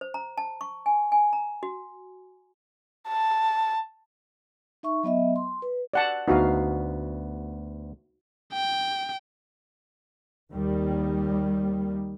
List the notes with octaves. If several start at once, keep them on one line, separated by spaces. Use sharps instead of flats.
C5
A#5
A5
C#6
G#5
G#5
A#5
F#4
A5
D#4 E5 C#6
F#3 B3 D#5 E5
C6
B4
D5 F#5 A5
D2 B3 D#4 F#4 F5
G5
D#2 D#3 G3